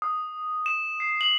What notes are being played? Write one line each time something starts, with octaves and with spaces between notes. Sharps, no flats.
D#6
E7
C7
F#7